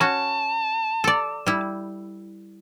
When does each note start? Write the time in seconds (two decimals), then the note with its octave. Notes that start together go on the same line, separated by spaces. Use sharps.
0.01 C#4 F#4 A5
1.04 A4 D5
1.46 G3 E4